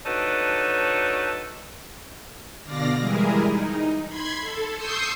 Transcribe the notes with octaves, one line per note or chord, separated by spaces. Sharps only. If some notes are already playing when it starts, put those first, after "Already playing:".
D4 D#4 F#4 A4 B4 C#5
B2 D3 D5 F5 A#6
E3 G3 G#3 E4 G#4 A#4
D#4
B5 C6 G#6
A4
C6 C#6 D#6 E6 G6 C7